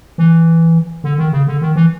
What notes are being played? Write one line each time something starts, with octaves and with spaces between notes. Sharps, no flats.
E3
D3
D#3
C#3
D3
D#3
E3